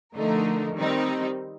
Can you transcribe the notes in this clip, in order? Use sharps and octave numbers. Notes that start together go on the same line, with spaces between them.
D3 F3 A3 D#4 A#4
D#3 G3 C4 D#4